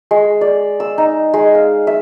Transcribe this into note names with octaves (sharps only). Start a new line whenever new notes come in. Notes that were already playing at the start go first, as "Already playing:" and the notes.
G#3
D5
E6
D#4
G#3
F5
E5